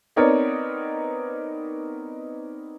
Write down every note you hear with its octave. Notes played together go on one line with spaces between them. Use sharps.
B3 C4 D#4 A#4 C#5 D5